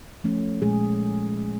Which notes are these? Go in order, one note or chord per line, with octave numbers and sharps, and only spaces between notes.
F3 A3 C#4
A#2 G#3 G#4